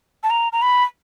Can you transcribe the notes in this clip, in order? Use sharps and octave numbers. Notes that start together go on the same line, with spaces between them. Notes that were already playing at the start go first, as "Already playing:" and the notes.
A5
A#5
A#5
B5